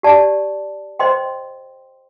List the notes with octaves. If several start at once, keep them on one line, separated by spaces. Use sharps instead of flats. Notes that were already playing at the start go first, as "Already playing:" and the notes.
G4 D5 A5
C5 D#5 G5 C6